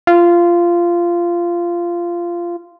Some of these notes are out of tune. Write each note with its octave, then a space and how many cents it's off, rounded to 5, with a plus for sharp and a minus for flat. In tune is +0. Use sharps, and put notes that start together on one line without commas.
F4 -15